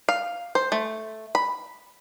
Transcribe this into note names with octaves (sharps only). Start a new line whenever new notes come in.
F5
C5
A3
B5